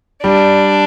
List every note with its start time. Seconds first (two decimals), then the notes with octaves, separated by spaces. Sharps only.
0.24 G3 D4